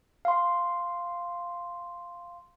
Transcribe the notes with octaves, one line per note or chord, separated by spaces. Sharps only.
F5 C6